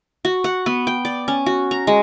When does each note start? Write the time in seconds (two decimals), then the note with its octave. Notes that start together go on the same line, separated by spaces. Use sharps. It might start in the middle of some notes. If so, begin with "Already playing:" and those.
0.25 F#4
0.44 F#5
0.66 B3
0.87 G5
1.05 D5
1.28 C#4
1.46 F#4
1.71 A#5
1.87 G#3